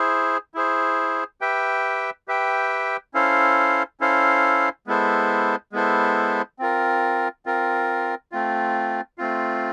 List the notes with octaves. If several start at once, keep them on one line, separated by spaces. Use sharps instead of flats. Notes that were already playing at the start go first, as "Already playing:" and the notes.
Already playing: E4 G#4 C5
E4 G#4 C5
G4 B4 E5 G5
G4 B4 E5 G5
C#4 E4 A4 C5 F5
C#4 E4 A4 C5 F5
G#3 B3 E4 A4 C5
G#3 B3 E4 A4 C5
C4 F4 A#4
C4 F4 A#4
A3 C4 F4
A3 C4 F4